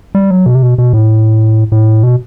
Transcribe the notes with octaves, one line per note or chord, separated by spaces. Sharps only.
G3
F#3
B2
C3
B2
B2
A2
A2
B2